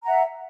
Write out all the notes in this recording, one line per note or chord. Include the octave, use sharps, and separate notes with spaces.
E5 F#5 A#5